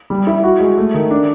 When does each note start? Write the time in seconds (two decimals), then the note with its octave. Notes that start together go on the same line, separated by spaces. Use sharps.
0.10 G3
0.27 E4
0.44 F#4
0.60 G#3
0.77 A3
0.94 D#3
1.11 D4